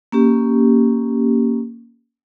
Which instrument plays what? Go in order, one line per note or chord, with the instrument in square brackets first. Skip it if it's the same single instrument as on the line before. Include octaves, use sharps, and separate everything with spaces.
[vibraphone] A#3 C#4 G4